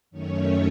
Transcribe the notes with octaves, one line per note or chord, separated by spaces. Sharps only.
F#2 D#3 A3 C#4 C#5